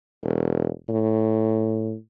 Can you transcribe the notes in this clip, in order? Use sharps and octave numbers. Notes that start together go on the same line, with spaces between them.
E1
A2